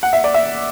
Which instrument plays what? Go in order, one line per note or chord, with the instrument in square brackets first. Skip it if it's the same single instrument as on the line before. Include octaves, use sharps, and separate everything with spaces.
[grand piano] F#5
E5
D5
E5